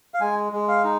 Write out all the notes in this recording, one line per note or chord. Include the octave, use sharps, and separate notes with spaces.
F5
G#3 G#5
G#3
F5
D#4